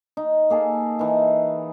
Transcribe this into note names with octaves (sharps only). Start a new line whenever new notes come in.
D#4
A#3 G#4 A4
E3 D#4